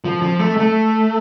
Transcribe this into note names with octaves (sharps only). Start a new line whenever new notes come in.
F3
F3
A3
A3